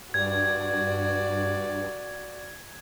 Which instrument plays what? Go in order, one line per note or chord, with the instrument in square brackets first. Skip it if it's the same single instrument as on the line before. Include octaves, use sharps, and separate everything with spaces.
[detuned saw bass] G2 [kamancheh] F#4 D5 [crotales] G#6